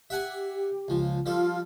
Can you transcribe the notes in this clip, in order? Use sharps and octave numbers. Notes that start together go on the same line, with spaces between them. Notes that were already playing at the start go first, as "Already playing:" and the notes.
G4 E5 F#5 G#5
C#2 F3
F3 G3 F4 A4 F6